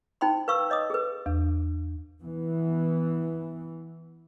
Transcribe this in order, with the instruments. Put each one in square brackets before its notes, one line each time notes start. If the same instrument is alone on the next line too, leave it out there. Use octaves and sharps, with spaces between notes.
[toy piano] D#4 C5 G5 B5 C6
B4 F5 C#6 E6
C#5 D#5 D6 D#6
G#4 A4 B4
[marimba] E2
[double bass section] E3 B3